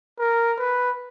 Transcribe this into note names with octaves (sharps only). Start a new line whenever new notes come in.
A#4
B4